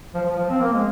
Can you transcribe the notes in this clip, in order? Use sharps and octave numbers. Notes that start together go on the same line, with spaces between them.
F3
F3
F3
C4
A#3
G#3